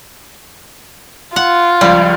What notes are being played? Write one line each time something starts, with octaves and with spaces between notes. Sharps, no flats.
F4 F#5
C#2 F3 G3 F5